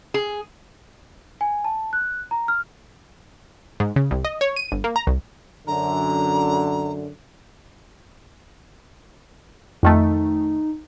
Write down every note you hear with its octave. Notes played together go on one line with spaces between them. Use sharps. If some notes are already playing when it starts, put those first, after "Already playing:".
G#4
G#5
A5
F#6
A#5
F6
G#2
C#3
C2
D#5
C#5
D#7
G1
A#3
A#5
C2
F#2 D3 A#5
F2 D#3 A3 D#4